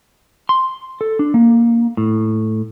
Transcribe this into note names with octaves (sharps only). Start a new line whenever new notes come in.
C6
A4
D4
A#3
A2